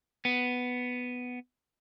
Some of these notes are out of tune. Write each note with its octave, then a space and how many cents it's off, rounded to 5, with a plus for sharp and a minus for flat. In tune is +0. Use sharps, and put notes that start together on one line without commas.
B3 +5